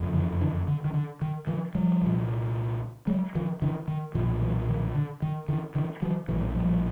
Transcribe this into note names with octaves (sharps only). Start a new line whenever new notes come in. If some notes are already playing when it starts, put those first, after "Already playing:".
Already playing: F#1 F2
D3 E3
D3 E3
D3
D#3
D3
D#3
D#3 F3
F3 G3
C2 A#2
F#3 G#3
D#3 F3
D3 E3
D#3
B1 A#2 D#3 F3
E3 F#3
D#3 F3
D3
D#3
D3 E3
D3 E3
E3 F#3
A#1 A2 E3 F#3
F3 G3